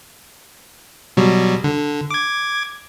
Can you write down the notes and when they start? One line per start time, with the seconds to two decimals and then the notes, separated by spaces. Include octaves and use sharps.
1.17 B2 F#3 G3
1.64 D3
2.10 D6 G#6